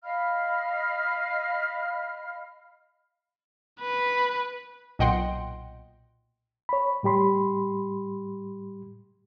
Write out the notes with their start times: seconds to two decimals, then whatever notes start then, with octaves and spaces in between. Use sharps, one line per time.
0.03 D#5 F5 B5 F6
3.81 B4
4.99 B1 A#2 D#5 F#5 G5 C6
6.69 C#5 B5
7.03 A2 G3 G4 B5 C6